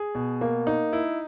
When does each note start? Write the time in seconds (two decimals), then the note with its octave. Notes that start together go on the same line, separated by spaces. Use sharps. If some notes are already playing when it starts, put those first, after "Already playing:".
Already playing: G#4
0.15 B2
0.41 A#3
0.67 D#4
0.93 E4